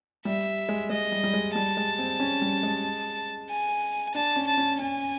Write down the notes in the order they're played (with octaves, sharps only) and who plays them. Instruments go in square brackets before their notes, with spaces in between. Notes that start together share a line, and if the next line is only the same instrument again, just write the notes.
[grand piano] G3 [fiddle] E5
[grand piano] G#3
[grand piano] G#3 [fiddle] D#5
[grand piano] G3
G3
G#3
[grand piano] G3 [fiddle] A5
[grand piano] G#3
C4
C#4
G3
G#3
[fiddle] G#5
[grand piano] D4 [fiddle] A5
[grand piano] C#4
[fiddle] A5
[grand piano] C#4
[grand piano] C#4 [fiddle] G#5